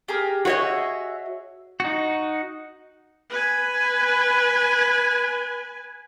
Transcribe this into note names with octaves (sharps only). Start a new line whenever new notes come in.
G4 G#4 A#4
F#4 G#4 C#5 D#5 E5
D#4 F#4
B4 G#5